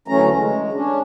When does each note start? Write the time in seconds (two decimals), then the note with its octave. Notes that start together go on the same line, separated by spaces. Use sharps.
0.08 D2 E3 F#3 A3 C#4 A#5
0.35 G#3
0.73 C#4 D4